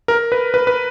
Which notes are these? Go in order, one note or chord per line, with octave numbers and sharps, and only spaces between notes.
A#4
B4
B4
B4